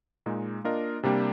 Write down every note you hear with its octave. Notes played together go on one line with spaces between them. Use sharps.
A#2 G#3 D#4
A#3 D4 F4 A#4 D#5
C3 G3 A#3 D4 G4